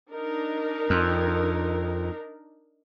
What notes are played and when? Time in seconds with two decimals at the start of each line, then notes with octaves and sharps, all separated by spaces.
0.11 D4 D#4 A#4
0.90 F2